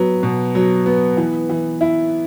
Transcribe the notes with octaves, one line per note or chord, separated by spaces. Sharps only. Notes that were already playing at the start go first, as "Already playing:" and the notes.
Already playing: F#3 B3
B2
F#3
B3
E3
E3
E4